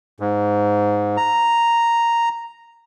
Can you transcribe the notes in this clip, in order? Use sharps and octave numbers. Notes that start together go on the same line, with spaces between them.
G#2
A#5